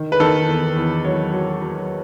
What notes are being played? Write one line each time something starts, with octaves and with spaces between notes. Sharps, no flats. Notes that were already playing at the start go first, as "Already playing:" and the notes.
Already playing: D#3
B4
D#3 A4
E2
E2
F#3 C#5
F#3
F#3